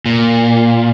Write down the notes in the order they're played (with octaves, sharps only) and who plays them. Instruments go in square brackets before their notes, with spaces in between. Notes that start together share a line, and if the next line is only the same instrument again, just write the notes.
[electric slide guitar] A#2